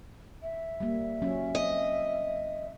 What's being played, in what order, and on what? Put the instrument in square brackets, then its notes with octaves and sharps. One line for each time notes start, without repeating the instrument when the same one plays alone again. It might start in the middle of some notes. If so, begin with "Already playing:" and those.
[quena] E5
[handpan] G3 A#3
F#3 C#4
[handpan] C4 [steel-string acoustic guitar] D#5